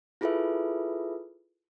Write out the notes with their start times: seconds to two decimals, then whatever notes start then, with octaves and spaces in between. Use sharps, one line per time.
0.21 E4 F4 G#4 A4 B4 E5